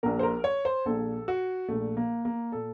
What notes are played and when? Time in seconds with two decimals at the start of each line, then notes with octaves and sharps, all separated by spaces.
0.03 A#1 A#2 A#4
0.19 C5
0.23 A#4
0.44 C#5
0.65 C5
0.86 A#1 A#2 A4
1.28 F#4
1.69 A#1 A#2 A3
1.97 A#3
2.25 A#3
2.52 A#2 A4